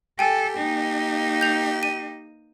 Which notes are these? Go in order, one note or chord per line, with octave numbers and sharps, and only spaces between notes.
G4 A4 G5 G#5
A#3 D#4
G6 F7
D#7